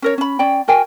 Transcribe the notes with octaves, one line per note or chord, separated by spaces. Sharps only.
C#4 A#4 C#5
C#4 B5
C#4 D5 G5
F#4 A#4 G5 G#5